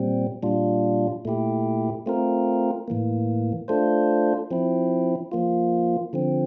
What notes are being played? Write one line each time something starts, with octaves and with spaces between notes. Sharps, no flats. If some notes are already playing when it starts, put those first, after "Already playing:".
Already playing: A#2 G3 C4
A#2 G3 D4 F4
A#2 A3 E4 G4
A3 C4 F4 A#4
A2 E3 A#3
A3 D4 F4 A4 C5
F3 C4 E4
F3 A#3 F4
D3 F3 C4